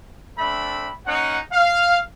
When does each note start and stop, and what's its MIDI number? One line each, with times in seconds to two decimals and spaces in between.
0.38 0.89 57
0.38 0.89 60
0.38 0.89 62
0.38 0.89 76
0.38 0.89 83
1.06 1.38 58
1.06 1.38 61
1.06 1.38 63
1.06 1.38 78
1.52 1.98 77